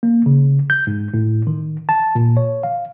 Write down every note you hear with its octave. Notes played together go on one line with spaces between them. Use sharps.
A#3
C#3
G6
G#2
A2
D#3
A5
A#2
C#5
F5